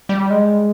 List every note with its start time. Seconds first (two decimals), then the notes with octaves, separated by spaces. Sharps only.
0.09 G3
0.30 G#3